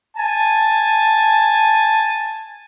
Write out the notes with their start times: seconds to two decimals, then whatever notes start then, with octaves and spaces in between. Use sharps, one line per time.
0.17 G#5 A5